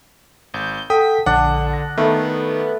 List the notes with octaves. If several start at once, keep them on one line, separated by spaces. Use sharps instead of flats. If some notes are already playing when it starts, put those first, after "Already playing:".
G#1 G6
A4 F#5 G5 A5 D#6 B6
A#1 D3 D4 F#5
A#6
D#3 A3 B3